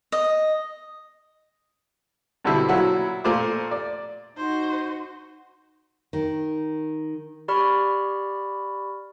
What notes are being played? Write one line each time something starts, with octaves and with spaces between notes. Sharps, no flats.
D#5
G2 B2 D3 G3 C4 E4
A#2 F#3 E4 F#4
A#2 A3 C5 D6
D5
D#4 F#4 C5
D#3
G4 D5 B5 C#6 F6